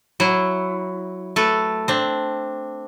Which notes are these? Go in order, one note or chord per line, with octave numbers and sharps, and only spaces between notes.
F#3 E4
A3 A4 B4
C4 D4